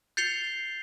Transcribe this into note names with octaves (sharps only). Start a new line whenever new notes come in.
G6 A6 C7 C#7 F7 G7